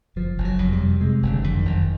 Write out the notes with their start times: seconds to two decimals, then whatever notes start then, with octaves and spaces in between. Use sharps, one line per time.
0.16 F#1 F3
0.38 F#1
0.44 F#3
0.59 F2
0.73 G3
0.81 C3
1.01 C3 G#3
1.22 F#1
1.30 D3
1.44 F2
1.59 D#3
1.65 F#1